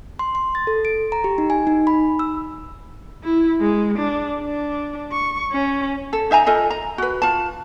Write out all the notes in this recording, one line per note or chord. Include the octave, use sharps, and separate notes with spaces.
C6
C6
A6
A4
D7
A#5
G4
D#4
G#5
D#4
B5
E6
E4
G#3
D4
D4
C#6
C#4
A4
D#4 E5 G#5 A#5
F4 A4 D#5 G#5
A#5
F#4 B4
F4 A5